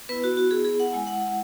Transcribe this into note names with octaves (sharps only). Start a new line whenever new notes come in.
B3 E4 B4
F#4
F#4
G#4
G#4
F#5
G#3 E4 G#5
F#5
F#5